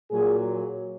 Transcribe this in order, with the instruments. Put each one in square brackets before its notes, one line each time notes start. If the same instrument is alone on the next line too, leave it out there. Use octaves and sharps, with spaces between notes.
[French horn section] A#2 F#3 G#4